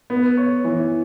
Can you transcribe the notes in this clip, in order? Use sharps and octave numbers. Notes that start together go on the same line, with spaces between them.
B3
C#5
E3